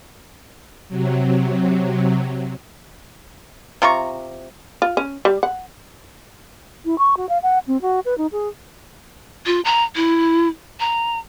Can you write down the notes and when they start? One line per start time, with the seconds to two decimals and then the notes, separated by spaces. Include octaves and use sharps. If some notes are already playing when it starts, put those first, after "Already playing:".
0.88 C3 F#3
3.82 C3 F4 A#5 C#6
4.82 F4
4.97 C#4
5.25 G3
5.43 F#5
6.85 E4
6.98 C#6
7.17 F#4
7.29 F5
7.43 F#5
7.67 C4
7.82 F#4
8.05 B4
8.18 D#4
8.32 G#4
9.46 F4
9.65 A#5
9.96 E4
10.80 A#5